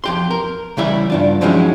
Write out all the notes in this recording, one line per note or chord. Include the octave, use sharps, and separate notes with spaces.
F2 G4 C6
A#4
C#3 E3 G3 E4 E5
G2 D4 F4
F3 F#3 G#3 C#4 D#4 E4